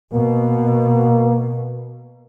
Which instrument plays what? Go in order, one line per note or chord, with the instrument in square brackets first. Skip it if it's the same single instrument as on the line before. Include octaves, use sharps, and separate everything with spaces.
[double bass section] B2 [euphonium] A#3